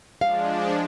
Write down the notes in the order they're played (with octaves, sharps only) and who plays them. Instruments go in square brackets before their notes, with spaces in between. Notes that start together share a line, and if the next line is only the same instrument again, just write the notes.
[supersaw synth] F3 G#3 D4 [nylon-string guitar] F5